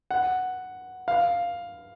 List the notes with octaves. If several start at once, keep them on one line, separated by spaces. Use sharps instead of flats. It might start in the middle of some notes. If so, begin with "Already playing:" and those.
F#5
F5